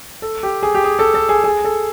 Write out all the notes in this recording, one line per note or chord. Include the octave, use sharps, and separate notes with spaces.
A4
G4
G#4
G4
G#4
A4
A4
G#4
G#4
A4